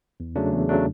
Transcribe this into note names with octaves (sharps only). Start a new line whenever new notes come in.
E2
C#3 F#3 A3 D4
E2
C#3 F#3 A3 D4